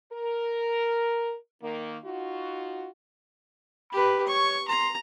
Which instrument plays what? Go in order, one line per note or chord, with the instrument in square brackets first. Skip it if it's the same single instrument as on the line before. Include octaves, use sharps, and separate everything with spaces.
[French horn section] A#4
D#3 A#3
D#4 F4 F#4
[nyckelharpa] G4 B4 [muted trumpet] B5
[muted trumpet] C#5 [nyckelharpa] C#6
[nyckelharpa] A#5 [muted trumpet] C6